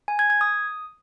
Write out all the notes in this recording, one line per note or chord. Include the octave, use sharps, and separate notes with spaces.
G#5
G#6
G#6
D#6